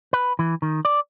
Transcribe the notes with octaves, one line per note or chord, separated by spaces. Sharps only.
B4
E3
D#3
D5